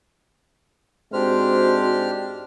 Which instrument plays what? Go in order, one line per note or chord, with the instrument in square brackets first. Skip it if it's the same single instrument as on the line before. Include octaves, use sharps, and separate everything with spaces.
[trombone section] G#2 G#3 C4 [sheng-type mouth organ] D4 G4 F6 [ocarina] F#4 [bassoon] C5